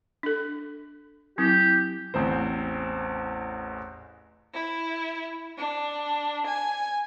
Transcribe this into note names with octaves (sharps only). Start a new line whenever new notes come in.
D4 A4
F#3 C4 E4 G4
A1 E2 C4 C5
E4
D4
G#5